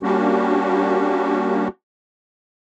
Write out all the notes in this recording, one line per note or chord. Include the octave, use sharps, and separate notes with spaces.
G3 A#3 C#4 D4 F#4 G4